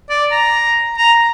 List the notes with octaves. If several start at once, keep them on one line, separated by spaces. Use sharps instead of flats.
D5
A#5
A#5